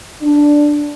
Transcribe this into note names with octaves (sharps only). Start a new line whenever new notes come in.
D4